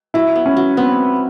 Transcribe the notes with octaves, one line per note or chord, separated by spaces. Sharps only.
F#3 E4
B3
C#4
F#3
B3 C4